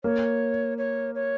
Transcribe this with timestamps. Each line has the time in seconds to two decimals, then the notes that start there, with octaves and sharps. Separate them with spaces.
0.04 A#3 C#5
0.78 C#5
1.15 C#5